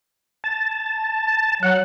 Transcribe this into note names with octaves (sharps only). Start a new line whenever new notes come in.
A5
F#3 F#5